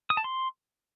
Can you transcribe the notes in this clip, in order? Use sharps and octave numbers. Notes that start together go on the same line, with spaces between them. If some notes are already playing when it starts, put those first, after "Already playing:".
D#6
A5
C6